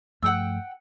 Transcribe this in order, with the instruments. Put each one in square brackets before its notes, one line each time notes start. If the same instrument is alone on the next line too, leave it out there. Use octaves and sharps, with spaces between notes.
[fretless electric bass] G2 F3 A3 [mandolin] F#5 G5 E6